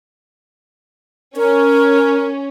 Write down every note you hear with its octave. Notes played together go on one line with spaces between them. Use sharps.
C#4 A#4